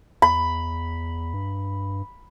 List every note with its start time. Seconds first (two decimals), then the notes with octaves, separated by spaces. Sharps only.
0.22 E2 B5
1.34 G2